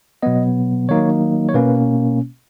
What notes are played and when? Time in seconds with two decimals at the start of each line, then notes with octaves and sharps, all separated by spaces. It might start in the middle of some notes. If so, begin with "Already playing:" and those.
0.22 B2 F#3 B3 D#5
0.88 D#3 F#3 A#3 D#4 C#5
1.49 C#5
1.54 B2 A#3 C#4 B4